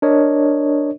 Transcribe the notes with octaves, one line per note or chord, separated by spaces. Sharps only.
D4 A#4 C#5 D#5